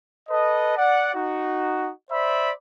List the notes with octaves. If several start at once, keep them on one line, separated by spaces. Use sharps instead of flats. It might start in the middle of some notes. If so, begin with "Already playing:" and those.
A4 B4 D#5
D5 F#5
D#4 F#4
C5 D5 E5 B5